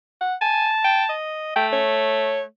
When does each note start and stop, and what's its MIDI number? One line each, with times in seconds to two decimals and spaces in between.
0.21 0.35 78
0.41 0.72 80
0.41 1.11 81
0.84 1.04 79
1.09 1.56 75
1.56 2.46 57
1.56 1.67 79
1.73 2.43 73